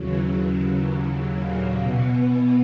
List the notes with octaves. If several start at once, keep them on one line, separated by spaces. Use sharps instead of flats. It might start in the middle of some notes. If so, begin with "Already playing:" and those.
Already playing: D#2 C#3 E3 F#3
F#3
A#2 A#3
B2 E3 B3